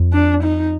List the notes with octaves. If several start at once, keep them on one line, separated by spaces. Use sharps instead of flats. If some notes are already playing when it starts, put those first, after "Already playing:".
Already playing: F2
D4
D#4